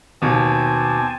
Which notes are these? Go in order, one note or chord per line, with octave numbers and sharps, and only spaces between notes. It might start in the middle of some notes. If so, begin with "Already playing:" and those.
D#2 B2 C4 G#5 A5